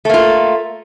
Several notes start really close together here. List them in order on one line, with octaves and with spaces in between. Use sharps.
A3 A#3 F4